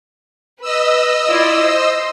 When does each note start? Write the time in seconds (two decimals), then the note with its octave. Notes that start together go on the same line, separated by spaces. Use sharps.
0.61 B4 D#5 E6
1.28 E4 F4 D5
1.62 C5